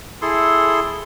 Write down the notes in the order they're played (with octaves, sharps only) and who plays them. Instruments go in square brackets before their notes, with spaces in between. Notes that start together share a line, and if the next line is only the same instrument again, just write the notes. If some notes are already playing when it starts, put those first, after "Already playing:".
[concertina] E4 G#4 A4 C6